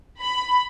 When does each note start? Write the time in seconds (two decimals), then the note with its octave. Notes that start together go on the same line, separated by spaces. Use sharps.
0.21 B5